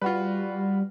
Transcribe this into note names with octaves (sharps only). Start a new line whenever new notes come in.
G3 F4 F#4 B4